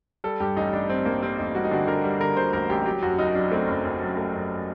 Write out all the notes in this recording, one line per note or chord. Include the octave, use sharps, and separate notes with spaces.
G3 A4
G2 G4
A1 D#4
A1 D4
G3 C4
G2 A#3
G3 C4
A1 D#4
G3 F#4
D#4
D3 F#4
D3 A#4
G3
D3 A#4
D3 C5
A1 A#4
A1 G4
F#3 G4
F#2 F#4
F#1 D#4
F#3 D4
A3 C4
F#1
F#1
F#2
A3
F#2